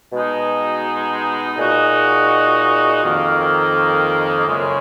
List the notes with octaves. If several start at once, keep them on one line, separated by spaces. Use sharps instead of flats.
B2 G#3 D#4
A#2 G#3 D#4 F#4
F2 D#3 A#3
F#2 C#3 G#3